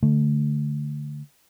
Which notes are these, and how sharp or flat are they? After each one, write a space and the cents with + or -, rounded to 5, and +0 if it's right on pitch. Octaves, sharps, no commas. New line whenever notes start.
D3 -10 A3 +0